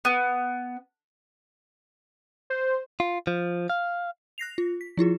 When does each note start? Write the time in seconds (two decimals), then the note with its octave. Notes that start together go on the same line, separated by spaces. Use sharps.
0.05 B3
2.50 C5
3.00 F4
3.27 F3
3.70 F5
4.38 F#6 A#6 C7 F7
4.58 F4
4.81 B6
4.97 F3 E4 F4 G#4